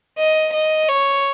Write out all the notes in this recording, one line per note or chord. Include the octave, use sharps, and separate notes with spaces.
D#5
D#5
C#5